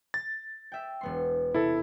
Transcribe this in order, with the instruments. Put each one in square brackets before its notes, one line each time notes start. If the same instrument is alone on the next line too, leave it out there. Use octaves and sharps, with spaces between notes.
[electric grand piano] A6
[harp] E5 G5
E1 B3 C6
[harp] C3 [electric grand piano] E4 A4